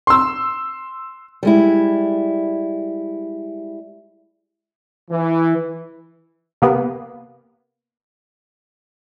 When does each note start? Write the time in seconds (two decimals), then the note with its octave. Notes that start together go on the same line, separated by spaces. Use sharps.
0.07 C6 E6
1.43 G3 G#3 E4
5.10 E3
6.62 C3 A#3 B3